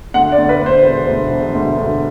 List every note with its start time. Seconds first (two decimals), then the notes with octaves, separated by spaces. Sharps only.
0.14 D2 F#5
0.32 D5
0.38 D2
0.49 B4
0.61 D2
0.66 C5
0.84 E1 C5
1.08 D2
1.31 E1
1.55 D2
1.77 D2